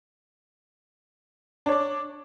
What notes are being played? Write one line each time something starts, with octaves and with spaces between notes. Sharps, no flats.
D4 C#5 D5